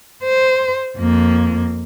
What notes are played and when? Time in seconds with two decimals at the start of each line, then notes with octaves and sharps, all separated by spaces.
0.23 C5
0.97 F2 A#3